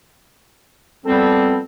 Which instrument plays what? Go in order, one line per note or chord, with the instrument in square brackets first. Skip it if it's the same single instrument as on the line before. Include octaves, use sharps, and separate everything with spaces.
[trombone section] F2 B3 A4 [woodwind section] G3 C4